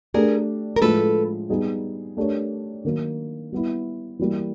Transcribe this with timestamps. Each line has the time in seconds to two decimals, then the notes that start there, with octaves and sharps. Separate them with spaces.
0.14 A3 D4 G4 G#4 A#4
0.76 A#4
0.82 A2 F3 G#3 A4 B4
1.49 G3 B3 D#4 G#4
2.17 A3 D4 G4 A#4 C#5
2.85 D#3 F#3 A#3
3.52 G3 B3 E4
4.19 E3 G3 A#3